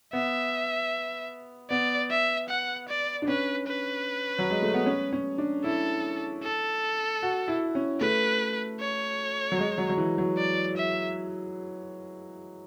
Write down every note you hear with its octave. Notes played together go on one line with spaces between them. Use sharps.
B3 E5
B3 D5
E5
F#5
D5
D4
C#4 B4
B4
F#3
G#3
A3
B3
C#4
C#4
D4
E4 A4
A4
F#4
E4
C#4
A3 B4
C#5
F#3
G#3
F#3
F#3
E3
F#3
D5
E5